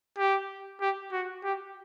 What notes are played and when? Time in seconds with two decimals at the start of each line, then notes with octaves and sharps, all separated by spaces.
0.18 G4
0.81 G4
1.12 F#4
1.44 G4